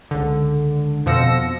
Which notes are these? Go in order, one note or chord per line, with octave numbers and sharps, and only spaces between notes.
C#2 D3
F2 B2 F3 E6 A#6 C#7